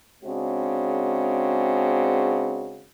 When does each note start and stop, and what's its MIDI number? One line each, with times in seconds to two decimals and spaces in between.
0.23 2.84 49
0.23 2.84 56
0.23 2.84 60
0.23 2.84 62
0.23 2.84 66